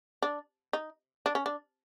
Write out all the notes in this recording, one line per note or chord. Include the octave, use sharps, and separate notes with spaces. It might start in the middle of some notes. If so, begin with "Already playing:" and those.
D4
D#4
D4
C#4
D4